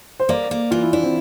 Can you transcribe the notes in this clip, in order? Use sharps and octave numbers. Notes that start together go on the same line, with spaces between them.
C5
A#3 D5
A#3
E3 F4
E4
D4 E4
C4